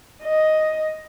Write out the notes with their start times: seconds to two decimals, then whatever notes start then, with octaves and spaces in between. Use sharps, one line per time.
0.23 D#5